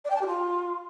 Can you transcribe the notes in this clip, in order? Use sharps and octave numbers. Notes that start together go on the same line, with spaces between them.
D5
G5
A5
G4
F4